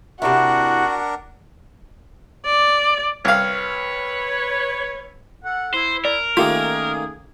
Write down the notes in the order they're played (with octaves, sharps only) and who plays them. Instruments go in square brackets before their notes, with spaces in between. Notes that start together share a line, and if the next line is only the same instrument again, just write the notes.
[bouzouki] C3 E4 [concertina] D4 A#4 [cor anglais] F#4 [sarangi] F#5
[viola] D5
[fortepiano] C2 F5 [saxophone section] B4 C#5
[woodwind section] A4 F#5
[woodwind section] E4 [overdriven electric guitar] C5
[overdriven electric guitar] A#4 [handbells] D5
[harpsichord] D#3 A3 A#3 [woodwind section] C#4 D#4 G#4 [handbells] F4 G4